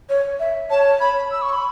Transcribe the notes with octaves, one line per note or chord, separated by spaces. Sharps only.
C#5
E5
C#5 A5
B5
E6
C#6
B5